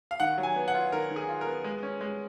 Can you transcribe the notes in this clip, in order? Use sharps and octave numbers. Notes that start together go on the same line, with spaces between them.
F5
D#3 F#5
F#3
G#5
B3
F#5
F4
D#3 A#4
D#3
G#4
F4
A#4
B3
G#3
C#4
G#3